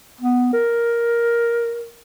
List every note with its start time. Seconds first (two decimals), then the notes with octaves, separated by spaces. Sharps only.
0.21 B3
0.53 A#4